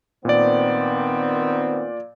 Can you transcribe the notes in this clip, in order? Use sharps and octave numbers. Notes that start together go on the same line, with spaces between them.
A#2 D#3 B3 C4 D5